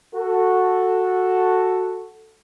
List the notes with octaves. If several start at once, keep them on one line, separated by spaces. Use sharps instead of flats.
F#4 A4